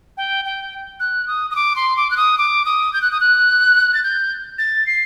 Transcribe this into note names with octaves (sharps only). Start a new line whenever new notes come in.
G5
G5
F#6
D#6
D#6
D6
C6
D6
F#6
D#6
D6
D#6
G6
F#6
D#6
F#6
A6
G6
A6
C7